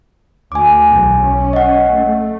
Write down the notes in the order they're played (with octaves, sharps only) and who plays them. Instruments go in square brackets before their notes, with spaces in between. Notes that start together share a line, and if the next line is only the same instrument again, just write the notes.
[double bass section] D2 [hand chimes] G#5 D6
[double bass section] B1 E2
C#4
[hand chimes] D#5 F#5
[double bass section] A3